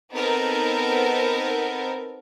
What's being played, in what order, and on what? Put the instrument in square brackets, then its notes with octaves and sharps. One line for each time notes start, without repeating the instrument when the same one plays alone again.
[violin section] B3 C4 D#4 A4 A#4